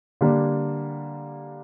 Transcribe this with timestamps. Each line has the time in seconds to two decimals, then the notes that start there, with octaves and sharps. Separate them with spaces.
0.21 D3 G3 A#3 D4